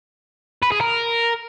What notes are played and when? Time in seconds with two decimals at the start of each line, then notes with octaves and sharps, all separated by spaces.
0.63 B4
0.72 G#4
0.81 A#4